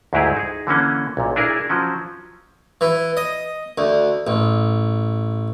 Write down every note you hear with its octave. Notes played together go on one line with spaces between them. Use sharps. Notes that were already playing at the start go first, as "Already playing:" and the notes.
D2 G#2 F#3 E4 G4 G#4
D#4 G#4
D3 E3 A#3 C#4
B1 A#2
D4 E4 G#4 A#4
F3 F#3 C#4
E3
D#5
D2
A1